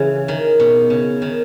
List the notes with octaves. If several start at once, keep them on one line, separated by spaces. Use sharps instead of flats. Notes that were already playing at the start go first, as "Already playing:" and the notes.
Already playing: C#3 E3
D#3
B2
C#3
D#3